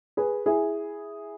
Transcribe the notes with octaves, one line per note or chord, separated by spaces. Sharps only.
G#4 B4
E4 G#4